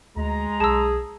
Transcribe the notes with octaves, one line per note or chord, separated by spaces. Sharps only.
D2 G#3 A#5
B1 G#4 A5 E6